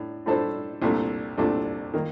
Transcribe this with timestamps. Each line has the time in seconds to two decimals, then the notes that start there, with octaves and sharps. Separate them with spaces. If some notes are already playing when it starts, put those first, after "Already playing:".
Already playing: A2 D4
0.26 A2 A3 D4 A4 C5
0.82 C2 A#2 A3 D4
1.38 C2 A#2 A3 D4
1.94 D#3 A#3